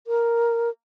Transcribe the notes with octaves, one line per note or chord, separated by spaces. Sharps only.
A#4